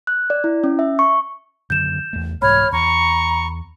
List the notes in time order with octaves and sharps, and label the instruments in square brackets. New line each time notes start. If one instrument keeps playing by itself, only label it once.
[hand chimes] F#6
D5
E4
C#4
E5
C#6
[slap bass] F#2 D3 D#3 [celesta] G6 E7
[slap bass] E2 A3
[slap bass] C2 G#2 E3 [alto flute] C#5 [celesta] B5 [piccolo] F6
[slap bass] E2 [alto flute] A#5 [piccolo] C#6